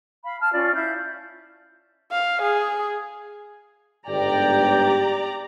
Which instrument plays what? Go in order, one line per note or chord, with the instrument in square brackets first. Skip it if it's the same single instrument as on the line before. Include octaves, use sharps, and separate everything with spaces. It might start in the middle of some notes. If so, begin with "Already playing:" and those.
[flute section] F5 B5
A5 F6
C#4 F4 D5
E4 F5 G6
[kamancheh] F5
G#4
[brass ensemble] G1 G#2 G5 [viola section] G4 D5 A#5